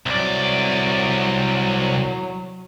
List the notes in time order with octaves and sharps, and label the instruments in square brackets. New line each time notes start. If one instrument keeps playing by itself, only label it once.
[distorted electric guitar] C2 D5 [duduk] F#3